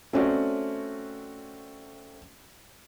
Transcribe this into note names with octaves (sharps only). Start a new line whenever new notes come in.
A3 C4 C#4 F#4 D5